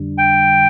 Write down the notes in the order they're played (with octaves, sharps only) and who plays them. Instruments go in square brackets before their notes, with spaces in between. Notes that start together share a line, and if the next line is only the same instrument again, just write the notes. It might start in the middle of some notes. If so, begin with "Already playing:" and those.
Already playing: [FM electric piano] F2 D3 G3 D4
[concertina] G5